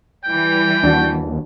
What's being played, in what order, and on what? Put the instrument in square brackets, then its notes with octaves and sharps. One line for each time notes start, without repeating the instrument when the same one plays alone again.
[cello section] E3 G3 [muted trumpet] G5
[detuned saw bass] D#2 [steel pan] D4 F#4